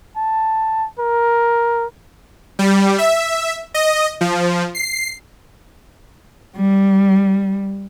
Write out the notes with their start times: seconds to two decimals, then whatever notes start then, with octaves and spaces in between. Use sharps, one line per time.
0.17 A5
0.99 A#4
2.59 G3
2.98 E5
3.74 D#5
4.21 F3
4.75 C7
6.57 G3